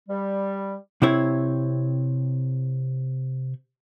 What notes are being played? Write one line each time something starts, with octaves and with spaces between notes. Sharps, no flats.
G3
C3 C4 E4 C#5